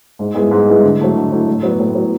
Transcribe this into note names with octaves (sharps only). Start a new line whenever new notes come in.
G#2
G#3 B3 E4 G#4
G#2
G#3 B3 E4 G#4
D3
F#3 A3 E4
D3
F#3 A3 E4
A2
F#3 B3
A2
F#3 B3